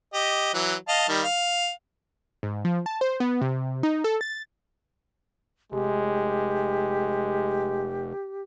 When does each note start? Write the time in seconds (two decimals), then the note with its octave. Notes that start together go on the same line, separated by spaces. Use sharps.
0.13 G4 D#5
0.54 E3 F#3
0.88 D#5 F5 A5
1.09 D#3 G3
1.23 F5
2.43 G#2
2.65 F3
2.86 A5
3.01 C5
3.20 B3
3.41 C3
3.83 D#4
4.04 A4
4.21 A6
5.72 F1 G#3 G4